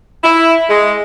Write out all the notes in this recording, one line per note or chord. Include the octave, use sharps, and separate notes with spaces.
E4
G#3